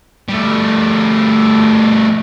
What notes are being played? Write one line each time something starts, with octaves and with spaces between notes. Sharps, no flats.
G3 A3